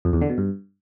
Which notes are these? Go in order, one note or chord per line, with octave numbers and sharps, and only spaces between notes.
F2
E2
D3
B2
G2